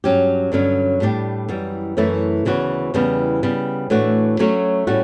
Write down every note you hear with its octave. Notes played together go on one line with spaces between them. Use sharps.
G2 F#3 C#4 G4
G2 D3 F#3 C#4
A2 G3 D4 G4
F#2 E3 G3
F#2 E3 A3 C#4 E4
D2 C#3 E3 B3 F#4
E2 C#3 E3 G3 B3
C#3 G3 B3
A2 E3 A3 D4 F#4
F#3 A3 C#4 F#4 C#5
A2 G3 C#4 F#4